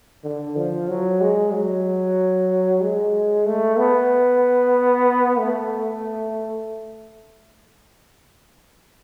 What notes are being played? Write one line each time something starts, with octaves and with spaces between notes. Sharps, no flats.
D3
F3
F#3
G#3
F#3
G#3
A3
B3
A3